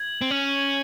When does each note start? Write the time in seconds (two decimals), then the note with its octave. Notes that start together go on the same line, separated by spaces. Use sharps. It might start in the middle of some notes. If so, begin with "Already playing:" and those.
Already playing: G#6 F#7
0.21 C4
0.31 C#4 F#7